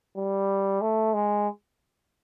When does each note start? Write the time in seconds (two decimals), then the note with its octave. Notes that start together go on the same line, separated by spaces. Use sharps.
0.16 G3
0.81 A3
1.14 G#3